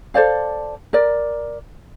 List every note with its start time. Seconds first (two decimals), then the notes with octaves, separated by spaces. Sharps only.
0.14 A4 C5 D5 F5
0.93 A#4 D5